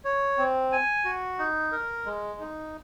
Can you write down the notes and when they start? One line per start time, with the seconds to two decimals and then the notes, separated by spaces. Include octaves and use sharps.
0.05 C#5
0.38 C4
0.72 G#5
1.05 F#4
1.39 D#4
1.72 A#4
2.06 G#3
2.40 D#4